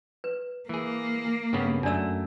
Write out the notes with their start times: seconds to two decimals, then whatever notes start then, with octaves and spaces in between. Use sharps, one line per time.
0.24 B4
0.69 E3 A#3 G#4
1.53 G2 C#3 B3
1.83 F#2 A3 D4 D5 E6